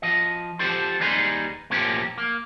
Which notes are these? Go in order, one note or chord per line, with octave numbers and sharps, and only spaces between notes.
F3 D#5
F3 G4 A4 C5
D#2 G3 D#4 G#4 B4 C6
B1 A2 F3 A#3 C#4 G4
A#3